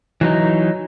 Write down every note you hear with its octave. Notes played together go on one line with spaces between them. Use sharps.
E3 F#3 D#4